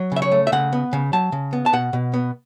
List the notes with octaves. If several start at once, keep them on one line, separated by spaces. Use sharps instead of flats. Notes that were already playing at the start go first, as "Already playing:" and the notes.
Already playing: F#3
C#3 E5
C#5
A3
E5
C#3 F#5
B3
C#3
F#3 A5
C#3
B3
A5
B2 F#5
B2
B3